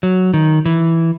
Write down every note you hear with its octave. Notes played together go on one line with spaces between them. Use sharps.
F#3
D#3
E3